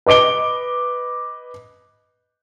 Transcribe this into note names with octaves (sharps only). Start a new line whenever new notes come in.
B4 D#5 D6 D7 G7